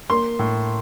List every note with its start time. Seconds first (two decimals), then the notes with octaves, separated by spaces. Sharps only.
0.10 A#3 C6
0.39 A2